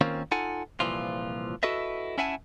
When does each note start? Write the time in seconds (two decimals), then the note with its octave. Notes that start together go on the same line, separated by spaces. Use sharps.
0.01 D#3 A#3 C4 C#4 F4
0.31 D#4 F4 A4 F#5 G#5
0.80 C2 A#2 E3 F3 F4
1.63 E4 F#4 A4 B4 D#5 E5
2.18 C#4 E4 E5 F#5 G#5 A5